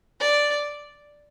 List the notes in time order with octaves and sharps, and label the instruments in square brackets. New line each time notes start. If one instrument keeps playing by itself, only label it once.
[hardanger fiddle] D5